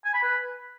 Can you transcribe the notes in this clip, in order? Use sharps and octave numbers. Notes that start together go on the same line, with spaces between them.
G#5
B5
B4